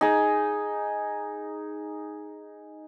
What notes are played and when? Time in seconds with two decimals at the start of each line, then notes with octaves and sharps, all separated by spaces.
0.01 D#4 G#4